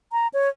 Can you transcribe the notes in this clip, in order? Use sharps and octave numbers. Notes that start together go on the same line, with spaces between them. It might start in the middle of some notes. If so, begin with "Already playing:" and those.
A#5
C#5